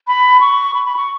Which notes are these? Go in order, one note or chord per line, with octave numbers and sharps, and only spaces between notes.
B5
C#6
B5
B5
C#6